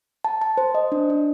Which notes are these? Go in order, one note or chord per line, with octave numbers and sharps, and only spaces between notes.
A5
A5
C5
D#5
D4
D4